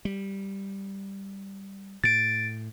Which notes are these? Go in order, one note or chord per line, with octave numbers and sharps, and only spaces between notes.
G3
A2 A6 D7